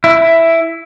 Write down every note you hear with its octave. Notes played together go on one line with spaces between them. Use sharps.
E4